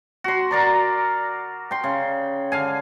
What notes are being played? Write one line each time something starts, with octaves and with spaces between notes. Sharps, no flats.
F#4 C6
A#4 D5 A#5
G5 C6
C#3
D3 F5 G#5